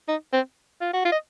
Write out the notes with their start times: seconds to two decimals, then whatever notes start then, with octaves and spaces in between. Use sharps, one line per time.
0.08 D#4
0.33 C4
0.81 F4
0.93 F#4
1.05 F4
1.12 D#5